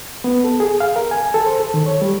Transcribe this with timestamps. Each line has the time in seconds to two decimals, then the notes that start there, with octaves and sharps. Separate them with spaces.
0.24 B3
0.44 A4
0.60 G#4
0.80 F5
0.96 A#4
1.11 G#5
1.34 A4
1.46 C5
1.60 A4
1.74 D#3
1.86 C#5
2.02 G3